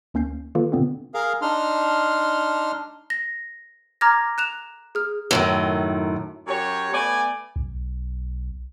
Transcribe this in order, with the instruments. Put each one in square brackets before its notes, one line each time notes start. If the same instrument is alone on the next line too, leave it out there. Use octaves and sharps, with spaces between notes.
[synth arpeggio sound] D2 A#3 C#4 G6 C7
D#3 A#3 F4 A4 B4
B2 D3 B3 C4 D4 F4
[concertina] G#4 A#4 F5
D4 D#4 C6 F6
[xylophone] A#6
A#5 D6 F6 G#6 A#6
F#6 E7 F7
G#4 F6
[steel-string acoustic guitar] F#2 A2 D#3
[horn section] F#2 G4 C#5
A3 B3 D5 G#5
[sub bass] B1